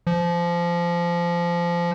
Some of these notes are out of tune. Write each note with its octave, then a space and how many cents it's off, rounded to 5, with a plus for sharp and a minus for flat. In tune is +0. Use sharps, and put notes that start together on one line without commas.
F3 -20